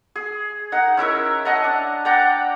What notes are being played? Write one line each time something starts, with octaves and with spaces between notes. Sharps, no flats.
G#4
D#4 F#5 A#5
C#4 E4 A#4 E5
D#5 F#5 A5 A#5
D4
D5 F#5 G5 A#5